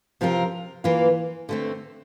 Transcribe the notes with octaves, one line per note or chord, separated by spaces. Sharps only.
C3 F3 C4 F4 A#4
E3 A#3 F4
D3 A3 C4